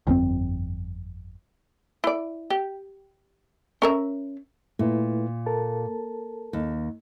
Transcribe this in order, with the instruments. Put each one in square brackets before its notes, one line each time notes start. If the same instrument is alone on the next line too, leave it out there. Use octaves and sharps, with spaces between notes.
[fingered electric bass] G1 F2 B2 C4
[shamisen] E4 D5
G4
C#4 A#4 E5
[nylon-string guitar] A#2 [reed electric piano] A3 E4 B4
[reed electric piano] A4 A#4 A5
[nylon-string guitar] D#2